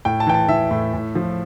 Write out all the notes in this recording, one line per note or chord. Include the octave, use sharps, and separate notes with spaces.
A2 G5
A5
E3 G5
A5
E3 E5
A2
A2
F3